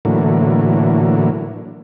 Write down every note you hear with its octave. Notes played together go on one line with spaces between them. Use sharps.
A2 D3 E3 F#3 A#3